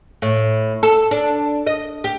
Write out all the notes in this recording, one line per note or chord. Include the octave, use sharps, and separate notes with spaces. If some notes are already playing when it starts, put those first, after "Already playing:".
A2
A4
D4
D#5
G4